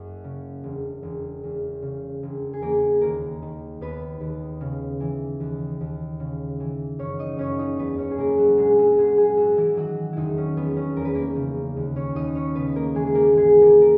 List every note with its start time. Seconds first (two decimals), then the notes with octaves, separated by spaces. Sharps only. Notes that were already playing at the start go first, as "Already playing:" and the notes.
Already playing: F#1 F#2 F#4
0.24 C#3
0.64 E1
1.03 E1
1.43 E2
1.82 C#3
2.23 E1
2.53 G#4
2.62 E1 A#3 A#4
3.01 D#2 A#3 A#4
3.42 D#3
3.81 D#2 B3 B4
4.21 D#2
4.61 C#3
5.00 E3
5.40 D#2
5.81 D#2
6.20 C#3
6.60 E3
6.99 F#1 C#4 C#5
7.19 D#4 D#5
7.37 F#1 C#4 C#5
7.59 D#4 D#5
7.79 E2 B3 B4
7.98 C#4 C#5
8.11 G#4
8.16 B2 A#3 A#4
8.38 F#3 F#4
8.58 A#1 G#3 G#4
8.78 F#3 F#4
8.97 A#1 G#3 G#4
9.17 G#3 G#4
9.37 G#2 F#3 F#4
9.57 E3 E4
9.77 D#3 F#3 F#4
10.13 E1 D#3 D#4 E4
10.38 C#4
10.57 E1 B3
10.76 C#4
10.96 E2 A#4
11.05 B4
11.14 A#3 A#4
11.36 C#3
11.76 D#2
11.96 C#4 C#5
12.15 D#2 D#4 D#5
12.35 C#4 C#5
12.55 C#3 B3 B4
12.76 A#3 A#4
12.95 E3 G#3 G#4
13.07 G#4
13.15 A#3 A#4
13.33 G#1 G#3 G#4
13.61 A#3 A#4
13.81 A#4